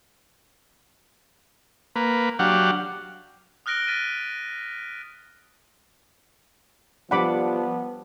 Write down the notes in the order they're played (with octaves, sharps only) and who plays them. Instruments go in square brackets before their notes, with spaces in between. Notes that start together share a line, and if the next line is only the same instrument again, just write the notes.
[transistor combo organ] A#3 B4
F#3 D4 G4 F5 F#5
[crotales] D#6 F6 F#6 A#6 D7 G7
F6 A6 B6 D#7
[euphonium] F3 [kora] G3 D4 [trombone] B3 [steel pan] F#5 B5 D6